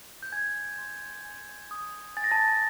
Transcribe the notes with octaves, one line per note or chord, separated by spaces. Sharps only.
G6
G#5 G#6
C6
G#5
D#6
G#5 A6
A#6
A5 A6